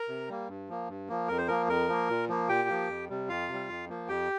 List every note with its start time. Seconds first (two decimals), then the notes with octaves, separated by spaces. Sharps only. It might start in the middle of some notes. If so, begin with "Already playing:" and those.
Already playing: A#4 A#5
0.09 C3
0.28 G3 A#3
0.49 G2
0.69 F3 A#3
0.89 G2
1.09 F3 A#3
1.28 F2 A#4
1.38 C5
1.48 F3 A#3 A#4
1.68 F2 A#4
1.88 F3 A#3
2.09 A#2
2.29 F3 A#3
2.49 A#2 G4 G5
2.69 F3 A#3
2.88 F2
3.09 C3 G3
3.29 F2 F4 F5
3.48 C3
3.53 G3
3.69 F2
3.89 F3 A#3
4.08 F2 G4 G5